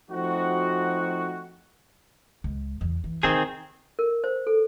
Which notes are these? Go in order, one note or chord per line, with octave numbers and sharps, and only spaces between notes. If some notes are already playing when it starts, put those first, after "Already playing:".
F3 A3 C4 D#4 F#4
C#2
E2
E3
C3 D#3 C4 G#4
A#4
C5
A4